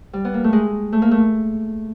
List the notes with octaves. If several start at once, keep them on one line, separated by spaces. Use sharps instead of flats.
G3
B3
A#3
A3
G#3
A3
A#3
A3